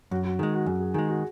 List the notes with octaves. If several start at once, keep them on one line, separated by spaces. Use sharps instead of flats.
F#2 F#4
F#4
D#3 G#3 G#4
F#4
F#2 F#4
G#4
D#3 G#3 G#4
F#4